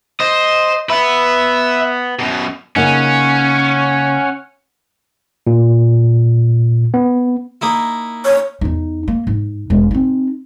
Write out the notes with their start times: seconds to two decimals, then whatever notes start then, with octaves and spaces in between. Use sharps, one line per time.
0.20 C5 D#5
0.90 B3 B4 E5
2.19 F#2 B2
2.76 C#3 A#3 C#4 D#4 F#5
5.47 A#2
6.94 B3
7.61 A#3 D#4 E4
8.25 C#5
8.61 E2 D#4
9.08 A#3
9.27 G#2
9.70 E1 G#3
9.91 C4 D#4